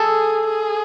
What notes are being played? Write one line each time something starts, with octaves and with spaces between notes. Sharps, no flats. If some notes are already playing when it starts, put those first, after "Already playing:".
Already playing: G#4 A4
G#4